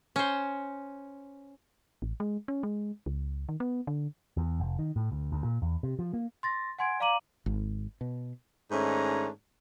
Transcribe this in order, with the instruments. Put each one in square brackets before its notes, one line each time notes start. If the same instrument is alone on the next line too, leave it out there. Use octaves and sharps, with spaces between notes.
[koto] C#4 C5
[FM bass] A1
G#3
C#4
G#3
C#2
D#3
B3
D3
[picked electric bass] E2
F1
D#3
A2
D2
D2
A#2
E2
C3
F3
A#3
[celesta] C6 A6 A#6
F#5 G#5 C6 G#6 D7
D5 F5 A#5 D6 D#7 F#7
[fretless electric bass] G#1
B2
[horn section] G#2 D#3 A3 C#4 D4 A#5